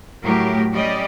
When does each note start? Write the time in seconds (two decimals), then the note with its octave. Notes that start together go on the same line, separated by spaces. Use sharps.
0.23 A2 F#3 A3 G4 A#4
0.73 G3 C#4 G4 D5 D#5